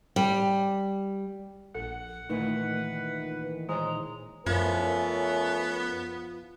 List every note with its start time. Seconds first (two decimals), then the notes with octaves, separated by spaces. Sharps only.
0.16 G3
1.75 A#1 A4 F#5
2.30 A#2 D#3 E3 A3 D#4 B4
3.69 G#3 C5 C#5 A#5
4.46 F#2 F3 A3 B3 C#4 A#4